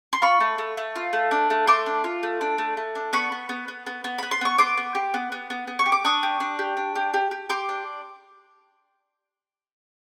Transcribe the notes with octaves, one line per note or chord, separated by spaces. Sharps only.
C6
F4 B5 C#6
A3
A3
A3
F4
A3
D4
A3
A3 C6 D6
D4
F4
A3
D4
A3
A3
D4
B3 B5 C#6
B3
B3
B3
B3
B3
B3 B5
C6
B3 C#6
B3 C6 D6
B3
G4
B3
B3
B3
B3
C#6
G4
D6
D4 C#6 D#6
G4
D4
G4
D4
G4
G4
G4
G4 C6 D6
D4